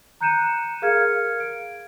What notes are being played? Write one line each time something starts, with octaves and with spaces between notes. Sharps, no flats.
A#5 F#6 G6 C#7 D#7 E7
G#4 A#4 F5 F6 G#6 C#7
D7